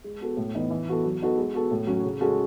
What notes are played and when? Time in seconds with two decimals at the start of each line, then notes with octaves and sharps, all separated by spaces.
0.04 G#3
0.20 B3 F#4 A4
0.37 A2
0.54 E3 B3 D#4
0.70 E3
0.88 B3 F#4 A4
1.04 F#3
1.21 B3 D#4 F#4 A4
1.38 G#3
1.54 B3 F#4 A4
1.71 A2
1.87 F#3 C#4
2.03 C#3
2.20 G#3 C#4 F#4 A4